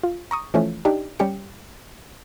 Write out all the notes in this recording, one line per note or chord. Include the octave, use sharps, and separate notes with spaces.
F4
A#5 C#6 D#6
E3 F3 A3 C#4
D4 D#4 G4
G3 C#4 G4 C#7